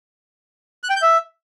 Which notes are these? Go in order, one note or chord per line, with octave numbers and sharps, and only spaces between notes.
F#6
G5
G6
E5